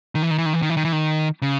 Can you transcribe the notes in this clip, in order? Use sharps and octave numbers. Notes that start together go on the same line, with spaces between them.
D#3
E3
D#3
E3
D#3
E3
D#3
E3
D#3
E3
D#3
C#3